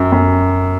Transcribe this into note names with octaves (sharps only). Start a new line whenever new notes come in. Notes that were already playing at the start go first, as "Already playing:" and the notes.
Already playing: F#2
F#2